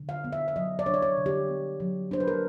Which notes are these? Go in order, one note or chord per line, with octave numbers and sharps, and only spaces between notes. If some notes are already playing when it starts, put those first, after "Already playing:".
Already playing: D3
F5
B3
E5
E5
F#3 D#5
D5
D4 C#5
D5
C#5
D3
G4
B3
F#3
D4 C5
B4
A#4